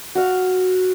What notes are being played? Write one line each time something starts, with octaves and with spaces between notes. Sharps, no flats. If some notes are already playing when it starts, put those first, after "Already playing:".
F#4 F5